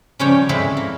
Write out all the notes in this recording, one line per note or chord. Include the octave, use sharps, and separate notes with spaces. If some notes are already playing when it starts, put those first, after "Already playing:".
C#3 F3 G3 C#4 C#5 G5
G3 G#3 C4 E4 F4 A4
A#3